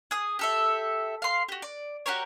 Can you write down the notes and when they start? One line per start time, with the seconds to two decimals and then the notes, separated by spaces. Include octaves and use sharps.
0.11 G#4 D#6
0.39 G4 A4 E5
1.22 F5 C6
1.49 F#4 G4
1.62 D5
2.06 F#4 G4 A#4 C#5